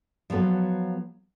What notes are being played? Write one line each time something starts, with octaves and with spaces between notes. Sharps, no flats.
F3 F#3 B3 A4